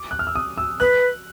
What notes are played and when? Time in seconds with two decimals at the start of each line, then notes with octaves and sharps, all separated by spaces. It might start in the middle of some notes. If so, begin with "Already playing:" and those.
Already playing: D6
0.11 F#6
0.19 F6
0.27 E6
0.36 D#6
0.58 E6
0.80 B4 F#6